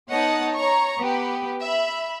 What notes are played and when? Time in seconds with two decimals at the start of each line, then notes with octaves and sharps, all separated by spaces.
0.11 B3 D#4 C#5 D#5 F#5 A5
0.55 C#5 A#5 C#6
0.99 B3 G4 B4
1.61 E5 B5